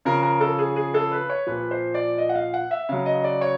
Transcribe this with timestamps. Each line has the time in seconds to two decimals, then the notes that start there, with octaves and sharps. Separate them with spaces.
0.05 C#3 F3 A#4
0.23 A#4
0.41 A4
0.59 G#4
0.76 G#4
0.94 A4
1.11 B4
1.30 C#5
1.47 A#2 F3 B4
1.71 C5
1.94 D5
2.18 D#5
2.29 F#5
2.35 F5
2.54 F#5
2.71 E5
2.89 C#3 F#3 F5
3.06 D#5
3.24 D5
3.41 C#5